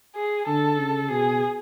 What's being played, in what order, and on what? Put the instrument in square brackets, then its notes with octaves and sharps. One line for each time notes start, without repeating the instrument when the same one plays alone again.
[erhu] G#4
[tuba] D3 [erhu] A4
[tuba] C#3
[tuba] B2 [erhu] G#4